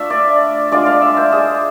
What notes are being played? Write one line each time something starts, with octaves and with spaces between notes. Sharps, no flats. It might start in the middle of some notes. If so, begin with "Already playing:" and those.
Already playing: A3 D4 F4 E5
D5
G#3 D4 F4 D5
F5
E5
C5
G#4